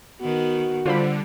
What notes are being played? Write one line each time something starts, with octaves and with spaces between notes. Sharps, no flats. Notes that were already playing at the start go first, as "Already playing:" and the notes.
D#3 B3 F#4
D3 G3 F4 C5 B5